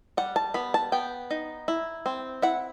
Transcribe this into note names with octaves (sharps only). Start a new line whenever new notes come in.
G3 F#5
A5
B3 B5
A5
B3 G5
D#4
E4
C4
E4 F#5